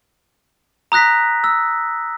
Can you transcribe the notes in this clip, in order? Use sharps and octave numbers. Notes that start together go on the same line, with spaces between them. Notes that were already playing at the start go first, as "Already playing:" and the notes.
A#5 D#6 F#6 A#6 B6
E6